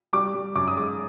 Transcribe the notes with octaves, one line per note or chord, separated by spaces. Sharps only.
G3 D6
G3
F#2 D6
D#6
G#3 D6